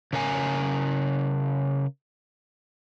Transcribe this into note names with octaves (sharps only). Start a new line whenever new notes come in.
C#3 A#4 G#5